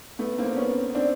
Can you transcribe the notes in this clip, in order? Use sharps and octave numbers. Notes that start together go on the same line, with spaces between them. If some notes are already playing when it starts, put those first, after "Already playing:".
A3 B3
A#3 C4
B3 C#4
C4 D4